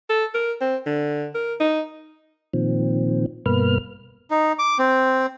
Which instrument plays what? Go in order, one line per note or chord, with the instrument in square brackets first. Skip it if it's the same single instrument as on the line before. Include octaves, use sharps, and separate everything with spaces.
[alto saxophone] A4
A#4
C4
D3
A#4
D#4
[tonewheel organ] A#2 D#3 F3 C4
G2 B2 A#3 B4 F6
[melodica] D#4
D6
C4